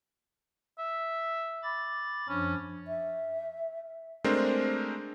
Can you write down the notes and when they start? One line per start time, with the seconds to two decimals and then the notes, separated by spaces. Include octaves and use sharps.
0.78 E5
1.63 B5 D6 A6
2.29 F#2 F3 C#4 D4
2.87 E5
4.24 G#3 A3 C4 D4 A#4 C5